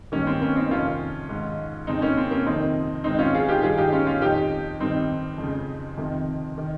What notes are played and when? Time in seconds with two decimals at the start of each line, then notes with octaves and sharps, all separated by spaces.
0.12 G2 D#3 A#3 C#4
0.27 C4
0.42 A#3 C#4
0.56 C4 D#4
0.71 F2 C3 D#3 C#4 F4
1.29 G#2 D#3
1.87 F2 C#3 C4 D#4
2.02 A#3 C#4
2.17 C4
2.31 A#3 C#4
2.46 F2 C3 D#3 C4 D#4
3.04 G#2 D#3 C4 D#4
3.19 C#4 F4
3.34 F4 G#4
3.49 D#4 G4
3.63 G2 D#3 F4 G#4
3.78 D#4 G4
3.92 C#4 F4
4.06 C#4 F4
4.21 F2 D#3 D#4 G4
4.79 G2 D#3 C4 D#4
5.38 F2 C#3
5.97 F2 C3 D#3
6.58 D#3